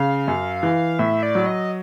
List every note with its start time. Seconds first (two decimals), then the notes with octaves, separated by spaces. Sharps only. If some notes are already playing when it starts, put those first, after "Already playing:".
Already playing: C#3 F5
0.28 F#2
0.63 E3
0.99 A2 E5
1.23 D5
1.35 F#3
1.46 D#5